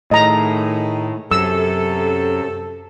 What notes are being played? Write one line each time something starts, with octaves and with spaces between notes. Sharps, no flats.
A2 D#3 D#4 G#4 D#5 A#5
F#2 C3 A4 E6